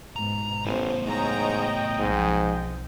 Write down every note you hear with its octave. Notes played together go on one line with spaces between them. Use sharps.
G#2 B2 A#5
A1 A2 B3 C5
G#2 C#5 D#5 G5 A#5
B1 F2 G#2 F3